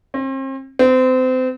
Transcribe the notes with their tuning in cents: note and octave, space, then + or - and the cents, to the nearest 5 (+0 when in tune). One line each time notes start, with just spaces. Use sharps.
C4 +40
C4 -30